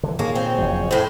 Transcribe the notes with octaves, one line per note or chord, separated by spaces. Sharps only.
D3 E3
A#2 D3 D#3 A#3 G#4 C#5
C4
F#1 F2 F#3
A2 C4